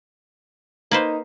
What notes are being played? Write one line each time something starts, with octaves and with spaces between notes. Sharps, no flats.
A#3 D#4 B4 C5